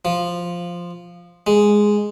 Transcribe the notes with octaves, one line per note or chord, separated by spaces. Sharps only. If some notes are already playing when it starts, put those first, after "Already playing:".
F3
G#3